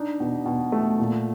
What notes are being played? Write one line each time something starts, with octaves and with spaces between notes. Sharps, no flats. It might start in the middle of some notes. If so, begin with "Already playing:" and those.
Already playing: D4 D#4
B2
B2
A3
A#2